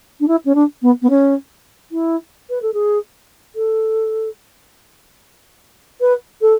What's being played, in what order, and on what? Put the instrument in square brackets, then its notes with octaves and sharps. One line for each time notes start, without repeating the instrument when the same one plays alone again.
[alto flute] D4
E4
C#4
D4
B3
B3
C#4
E4
B4
A4
G#4
A4
B4
A4